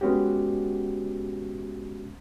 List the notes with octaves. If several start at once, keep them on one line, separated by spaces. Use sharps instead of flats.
G#3 B3 C#4 F#4 G4